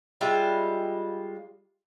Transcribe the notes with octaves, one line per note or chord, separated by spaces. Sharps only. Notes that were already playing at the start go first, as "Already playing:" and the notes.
G3 G#3 F4 E5